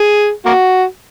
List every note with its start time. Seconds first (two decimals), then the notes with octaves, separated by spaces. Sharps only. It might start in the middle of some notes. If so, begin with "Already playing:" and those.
Already playing: G#4
0.46 A#3 F#4